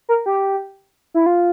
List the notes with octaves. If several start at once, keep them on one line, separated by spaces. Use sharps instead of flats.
A#4
G4
E4
F4